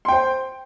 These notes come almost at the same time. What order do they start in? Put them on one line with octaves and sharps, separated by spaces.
C6 G5 C5